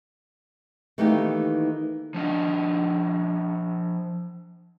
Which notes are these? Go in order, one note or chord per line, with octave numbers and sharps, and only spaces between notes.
D#3 E3 A3 A#3 D#4 G4
F3 D4 D#5